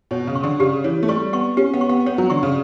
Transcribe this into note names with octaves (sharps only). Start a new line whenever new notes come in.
B2 C#5
C#3
C#6
D3
C#3 G4
E3 C#5
A3
G3 C#6
B3 C#6
C#4 G4
B3
C#6
B3
B3 C#5
F#3
D3 C#6
C#3